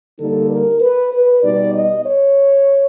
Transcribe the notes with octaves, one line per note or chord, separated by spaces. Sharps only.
D3 G3 A#3 D#4 A4
A#4
B4
B4
B2 G3 B3 D#4 D5
D#5
C#5